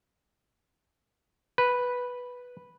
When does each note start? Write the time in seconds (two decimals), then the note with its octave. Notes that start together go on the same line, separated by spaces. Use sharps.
1.58 B4